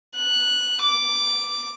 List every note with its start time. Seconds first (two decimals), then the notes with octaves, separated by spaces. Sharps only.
0.17 F#6
0.82 D6